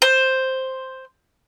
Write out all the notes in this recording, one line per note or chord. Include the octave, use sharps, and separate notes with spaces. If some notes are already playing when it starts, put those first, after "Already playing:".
C5